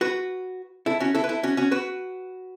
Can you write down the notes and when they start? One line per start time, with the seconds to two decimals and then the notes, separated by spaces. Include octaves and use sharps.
0.01 F#4 B4
0.86 E4 A4
1.00 C#4 F#4
1.15 E4 A4
1.24 B4
1.29 E4 A4
1.43 C#4 F#4
1.57 C#4 F#4
1.71 F#4 B4